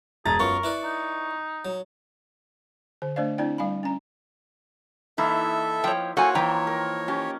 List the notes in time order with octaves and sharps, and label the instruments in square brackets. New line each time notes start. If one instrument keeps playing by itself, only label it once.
[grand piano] E1 A#5 A6 [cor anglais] G#4
[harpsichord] F#2 B3 F4 [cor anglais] A#4 [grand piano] C#6
[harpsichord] E4 B4 D5
[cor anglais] D#4
[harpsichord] F#3
[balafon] D3 C5
A3 D4 C5 D5 F5
C4 D4 E4 D5 G5
G3 F5 G#5 B5
C#4 A#5
[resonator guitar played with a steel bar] E3 [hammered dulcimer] A#3 D#4 E4 [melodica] A4 E5
[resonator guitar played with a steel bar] F3 [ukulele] C#5 G5
[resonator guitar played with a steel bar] A#3 F#4 [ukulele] A4 G#5 [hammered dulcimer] C5 G5 [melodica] C#5
[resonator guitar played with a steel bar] E3 [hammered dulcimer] F3 A#3 [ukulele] G5 A#5
[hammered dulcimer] A#4
[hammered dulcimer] C#4 [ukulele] G4